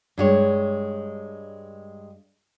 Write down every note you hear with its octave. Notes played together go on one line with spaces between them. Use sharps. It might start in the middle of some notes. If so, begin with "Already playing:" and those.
G2 G#3 C#5